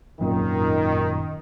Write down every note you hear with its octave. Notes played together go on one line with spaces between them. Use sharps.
G#1 F#2 A#2 D#3